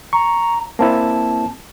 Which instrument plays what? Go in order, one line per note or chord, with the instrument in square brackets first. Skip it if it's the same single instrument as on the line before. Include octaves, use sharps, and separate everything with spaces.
[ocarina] A#5 [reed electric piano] C#6
[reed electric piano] A#3 C4 E4 [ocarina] A5